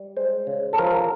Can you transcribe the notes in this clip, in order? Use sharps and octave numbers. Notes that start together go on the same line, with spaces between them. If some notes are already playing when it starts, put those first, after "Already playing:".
Already playing: G3
G#3 C5
C#3
A4
F3 A#4
A#4